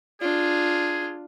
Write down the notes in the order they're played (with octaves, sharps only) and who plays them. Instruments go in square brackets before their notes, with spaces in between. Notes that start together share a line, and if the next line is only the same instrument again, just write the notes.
[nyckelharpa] D4 F4 [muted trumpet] G#4